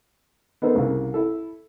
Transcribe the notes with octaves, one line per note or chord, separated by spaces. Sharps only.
B3 D#4 A4 A#4 C5
C2 C#3 A#3
E4 A4